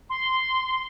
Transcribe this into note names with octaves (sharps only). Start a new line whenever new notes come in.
C6